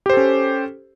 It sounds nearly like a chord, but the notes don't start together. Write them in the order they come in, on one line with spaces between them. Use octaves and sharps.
G4 C5 A4 C#4